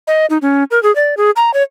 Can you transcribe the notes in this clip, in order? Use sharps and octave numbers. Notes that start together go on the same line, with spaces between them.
D#5
D#4
C#4
A#4
G#4
D5
G#4
A#5
C#5